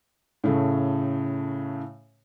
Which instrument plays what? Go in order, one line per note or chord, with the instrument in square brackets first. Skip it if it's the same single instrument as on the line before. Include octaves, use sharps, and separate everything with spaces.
[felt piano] A2 C#3 A3